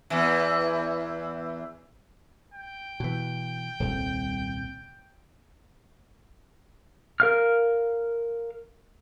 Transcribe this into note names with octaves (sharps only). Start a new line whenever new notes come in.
E2 E3
G5
B2 E3
D#1 C2
A#4 F5 F6